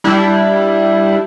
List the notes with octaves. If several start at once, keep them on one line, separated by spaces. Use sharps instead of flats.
G3 D4 E4